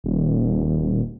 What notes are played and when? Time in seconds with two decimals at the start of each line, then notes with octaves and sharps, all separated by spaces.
0.04 D#1